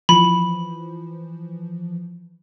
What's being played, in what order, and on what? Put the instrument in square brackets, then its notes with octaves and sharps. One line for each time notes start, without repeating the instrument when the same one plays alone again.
[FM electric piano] E3 F3 [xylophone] B5